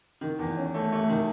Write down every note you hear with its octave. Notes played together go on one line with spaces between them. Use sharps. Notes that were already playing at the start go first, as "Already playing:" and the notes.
D#3
E2
C#4
A3
A3
D#3